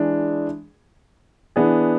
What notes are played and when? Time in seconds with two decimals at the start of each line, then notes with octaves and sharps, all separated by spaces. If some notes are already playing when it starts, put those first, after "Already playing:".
Already playing: E3 G#3 D4 G#4
1.56 E3 B3 D4 G#4